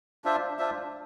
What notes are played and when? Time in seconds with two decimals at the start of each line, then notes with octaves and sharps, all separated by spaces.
0.24 D4 F4 C5 E5
0.59 D4 F4 C5 E5